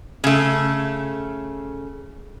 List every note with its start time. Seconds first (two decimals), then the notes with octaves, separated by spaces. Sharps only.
0.24 C#3 A3